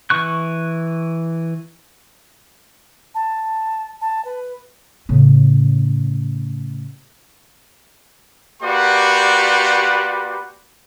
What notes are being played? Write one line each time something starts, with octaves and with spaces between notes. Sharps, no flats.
E3 C#6 F#6
A5
A5
B4
A2 C#3
A#3 F#4 G4 B4 D5 C6